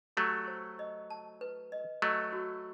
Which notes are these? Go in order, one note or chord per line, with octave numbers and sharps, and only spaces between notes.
F#3 A3 G4
C5
D#5
A5
B4
D#5
F#3 A3 D#5
F#4